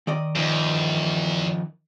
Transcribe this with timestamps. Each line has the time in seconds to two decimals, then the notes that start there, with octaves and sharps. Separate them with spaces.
0.07 D#3 D5 D#5
0.36 E2 F3 D#4